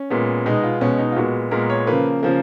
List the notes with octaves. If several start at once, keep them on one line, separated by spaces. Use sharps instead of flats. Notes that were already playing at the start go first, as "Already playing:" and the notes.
Already playing: C#4
A#2 G#3 B3
B2 G#3 B3 D#4
F4
B2 G#3 B3 C#4
D#4
F4
A#2 G#3 B3 F#4
A#2 G#3 B3 A#4
C#5
C#3 F3 A#3 B4
C#3 F3 A#3